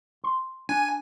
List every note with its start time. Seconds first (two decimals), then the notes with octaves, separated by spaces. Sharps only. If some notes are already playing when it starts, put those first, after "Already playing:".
0.24 C6
0.69 D4 G#5